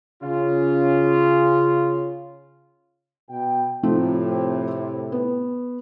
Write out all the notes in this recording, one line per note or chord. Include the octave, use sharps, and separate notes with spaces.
C#3 C#4 F4
B2 G5
A2 C3 F3 A3 C4
B3